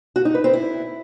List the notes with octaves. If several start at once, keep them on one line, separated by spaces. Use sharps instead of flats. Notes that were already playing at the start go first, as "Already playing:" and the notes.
F#4
D#4
B4
C4
E4